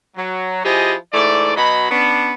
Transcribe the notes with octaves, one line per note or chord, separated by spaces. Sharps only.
F#3
F3 E4 G4 G#4 D#5 G#5
G#2 E3 A3 D5
B2 F#3 D#5 B5
B3 C#4 D4